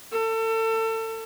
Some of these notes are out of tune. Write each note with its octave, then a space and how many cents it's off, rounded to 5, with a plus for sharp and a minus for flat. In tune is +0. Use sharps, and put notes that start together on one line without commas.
A4 +30